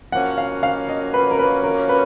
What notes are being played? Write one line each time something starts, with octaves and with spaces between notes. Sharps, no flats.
F3 A#3 C#4 F#4 F#5
F5
F5
D#5
B4
A#4
B4
A#4
B4